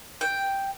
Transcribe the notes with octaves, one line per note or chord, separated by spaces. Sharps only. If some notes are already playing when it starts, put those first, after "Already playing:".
G5